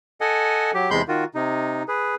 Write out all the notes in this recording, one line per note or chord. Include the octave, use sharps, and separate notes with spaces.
A4 D#5 F#5 G#5
F#3 G4
E2 C3 G#3 B5 C6 G6
D#3 F4 F#4
C3 D#4
G#4 B4